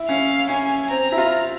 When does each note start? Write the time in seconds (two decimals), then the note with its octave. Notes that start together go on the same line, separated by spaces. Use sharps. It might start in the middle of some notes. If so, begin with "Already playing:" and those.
Already playing: E4
0.08 C#4 F5
0.49 C#4 G#5
0.90 C4 A#5
1.12 E4
1.18 F4